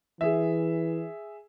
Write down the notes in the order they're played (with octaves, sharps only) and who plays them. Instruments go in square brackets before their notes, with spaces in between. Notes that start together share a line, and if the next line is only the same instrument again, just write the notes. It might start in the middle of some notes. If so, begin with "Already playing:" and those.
[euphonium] E3 [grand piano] G#4 E5